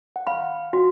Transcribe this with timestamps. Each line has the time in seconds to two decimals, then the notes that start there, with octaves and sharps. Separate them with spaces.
0.16 F#5
0.27 F5 B5
0.73 F#4